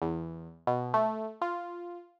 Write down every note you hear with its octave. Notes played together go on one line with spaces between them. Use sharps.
E2
B2
A3
F4